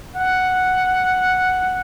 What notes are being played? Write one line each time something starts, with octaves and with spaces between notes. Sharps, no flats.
F#5